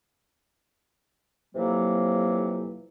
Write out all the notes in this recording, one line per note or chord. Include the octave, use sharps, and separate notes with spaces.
F2 C3 E3 F#3 A#3